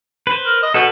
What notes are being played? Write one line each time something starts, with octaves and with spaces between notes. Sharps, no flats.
B4 C5
A#4
D#5
B2 A4 B4